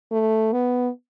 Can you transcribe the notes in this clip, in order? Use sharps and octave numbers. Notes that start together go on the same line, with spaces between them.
A3
B3